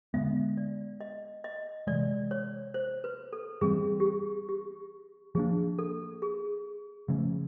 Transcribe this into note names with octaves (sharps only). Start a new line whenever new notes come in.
D3 F3 G#3 B3 E5
D5
D#5
D#5
C3 E3 G#3 D5
C#5
C5
B4
A4
E3 G3 C4 G#4
G4
G#4
G4
F3 A#3 D4 G#4
A4
G#4
C#3 F3 A3 C#4